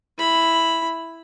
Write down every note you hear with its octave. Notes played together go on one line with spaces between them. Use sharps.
E4 B5